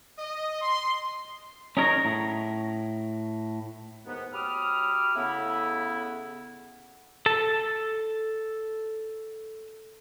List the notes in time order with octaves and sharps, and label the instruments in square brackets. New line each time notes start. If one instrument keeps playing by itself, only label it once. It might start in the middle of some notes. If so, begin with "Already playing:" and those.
[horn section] D#5
C6
[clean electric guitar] C#4 D#4 G#4 A#4 C#5 A#5
A2
[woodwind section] D#2 G#2 B3
F#3 G4 B5 D6 D#6 F6
C#3 A3 B3 E4
[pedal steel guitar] A4 A5